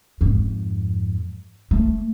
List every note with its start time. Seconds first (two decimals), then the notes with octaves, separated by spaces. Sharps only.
0.21 F2 G#2
1.71 A3